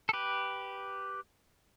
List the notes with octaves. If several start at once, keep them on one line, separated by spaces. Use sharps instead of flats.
A4
G4 B4